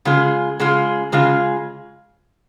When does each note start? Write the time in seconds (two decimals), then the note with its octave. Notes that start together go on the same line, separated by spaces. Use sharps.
0.05 C#3 G#3 F4 G#4
0.60 C#3 G#3 F4 G#4
1.12 C#3 G#3 F4 G#4